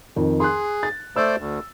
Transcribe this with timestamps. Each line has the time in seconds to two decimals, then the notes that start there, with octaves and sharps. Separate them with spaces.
0.16 F2 D#3
0.40 G#4 C6 F#6
0.83 A6
1.16 A3 C5 D5 E6
1.38 D2